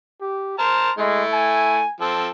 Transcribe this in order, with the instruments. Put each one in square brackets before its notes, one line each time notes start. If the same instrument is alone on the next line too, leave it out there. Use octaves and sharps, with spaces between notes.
[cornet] G4
[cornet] C5 [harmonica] A5 A#5 F6
[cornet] G#3 [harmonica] A3 E4
[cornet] G#5
[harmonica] F3 C4 A4